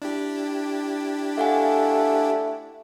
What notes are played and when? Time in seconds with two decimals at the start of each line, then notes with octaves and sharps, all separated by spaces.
0.02 D4 E4 G4
1.38 A3 F5 F#5 G#5